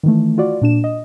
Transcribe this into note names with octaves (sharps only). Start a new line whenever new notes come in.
D#3 E3 A3
F4 F#4 D5
A#2 D4 E7
D#5